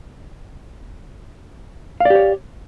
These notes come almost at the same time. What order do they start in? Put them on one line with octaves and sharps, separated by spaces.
F5 D5 G4 C#5